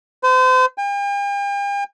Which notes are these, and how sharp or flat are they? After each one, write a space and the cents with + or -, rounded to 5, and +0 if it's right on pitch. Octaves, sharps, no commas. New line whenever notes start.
C5 -35
G5 +45